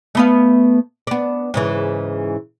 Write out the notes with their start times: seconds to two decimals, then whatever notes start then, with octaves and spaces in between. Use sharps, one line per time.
0.15 A3 B3 F5
1.07 B3 D4
1.54 G#2 C#3 E3